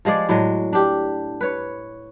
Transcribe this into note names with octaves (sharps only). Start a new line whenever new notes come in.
F3 G#3 G#4 D5
A2 F#3 G#3
D4 G4
B4 C#5